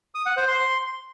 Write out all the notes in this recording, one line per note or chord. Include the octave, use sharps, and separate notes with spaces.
D#6
F#5
C5
C6